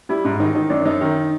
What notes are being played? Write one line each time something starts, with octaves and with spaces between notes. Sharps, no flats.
G3 E4
G#2
D#3 D#4
D#3 D#4
F#2 D4
F#2 D#4
D#3